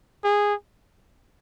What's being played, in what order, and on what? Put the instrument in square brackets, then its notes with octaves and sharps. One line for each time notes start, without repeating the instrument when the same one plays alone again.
[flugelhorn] G#4